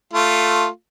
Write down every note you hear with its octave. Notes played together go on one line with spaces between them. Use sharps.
A3 F4